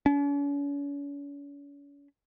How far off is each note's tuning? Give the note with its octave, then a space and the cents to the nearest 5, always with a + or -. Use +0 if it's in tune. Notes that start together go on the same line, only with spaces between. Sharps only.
C#4 +40